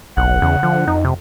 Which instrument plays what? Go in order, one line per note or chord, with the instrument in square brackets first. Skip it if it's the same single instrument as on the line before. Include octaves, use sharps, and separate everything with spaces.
[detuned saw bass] F#1 [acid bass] B1 [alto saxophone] F#5
[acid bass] E2 [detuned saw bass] C#3
[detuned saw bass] D3 [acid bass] F3
[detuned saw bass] F2 [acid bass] D#4
[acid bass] C3